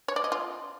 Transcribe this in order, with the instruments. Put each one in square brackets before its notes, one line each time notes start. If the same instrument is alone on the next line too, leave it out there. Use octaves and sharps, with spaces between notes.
[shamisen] C#5
D5
D#5
F4